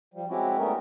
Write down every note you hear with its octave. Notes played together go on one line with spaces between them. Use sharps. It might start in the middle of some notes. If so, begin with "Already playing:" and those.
F3 G3
G#3 C4 C#4 E4 F#4 G4
G3 A3 B3 A#4